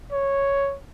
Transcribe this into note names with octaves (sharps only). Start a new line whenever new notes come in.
C#5